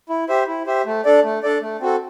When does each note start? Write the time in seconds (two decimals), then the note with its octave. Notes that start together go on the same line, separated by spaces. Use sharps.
0.09 E4
0.29 G4 C5 E5
0.48 E4
0.67 G4 C5 E5
0.86 A3
1.05 D4 A4 D5
1.24 A3
1.43 D4 A4 D5
1.62 A3
1.81 C4 F#4 A4